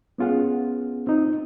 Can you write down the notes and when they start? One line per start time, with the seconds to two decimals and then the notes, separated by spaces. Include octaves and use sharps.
0.18 B3 C#4 F4 G#4 F#5
1.07 C4 D#4